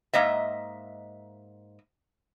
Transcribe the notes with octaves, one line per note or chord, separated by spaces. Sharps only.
G#2 A#3 D#5 E5